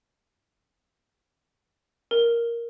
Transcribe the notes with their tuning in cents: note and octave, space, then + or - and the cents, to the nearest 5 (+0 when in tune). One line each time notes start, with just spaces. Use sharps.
A#4 +5